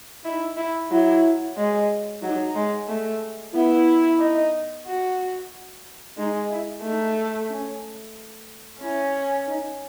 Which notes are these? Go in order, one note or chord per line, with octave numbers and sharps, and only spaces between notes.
D#4 E4
E4
F#3 E4
G#3
F#3 D#4
G#3
A3
B3 E4
D#4
F#4
G#3 D#4
E4
A3 D#4
C#4
C#4 E4
D#4